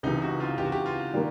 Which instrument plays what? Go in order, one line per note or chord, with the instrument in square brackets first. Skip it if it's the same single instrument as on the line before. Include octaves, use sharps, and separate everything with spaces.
[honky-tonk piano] C#2 C3 E3 [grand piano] D#4
[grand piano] F#4
F4
[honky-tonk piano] C#2 C3 E3 [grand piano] G4
[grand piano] F#4
G4
F4
[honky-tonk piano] D#3 G3 A#3